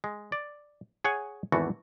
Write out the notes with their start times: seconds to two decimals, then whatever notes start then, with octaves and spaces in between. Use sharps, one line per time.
0.04 G#3
0.32 D5
1.04 G#4 C#5 F#5 G#5
1.52 G#1 E2 E3 A3 F#4